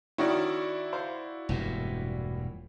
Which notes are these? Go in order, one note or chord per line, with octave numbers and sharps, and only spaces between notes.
D#3 C#4 E4 F#4 D5
C5 F5
E1 G2 A#2